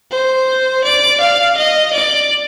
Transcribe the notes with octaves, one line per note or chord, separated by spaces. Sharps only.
C5
D5
F5
D#5
D5